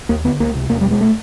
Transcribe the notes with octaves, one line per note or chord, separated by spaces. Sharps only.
D#2 A#3
D3 B3
C#2 A#3
C3
E2 A#3
B2 G3
G#3
A3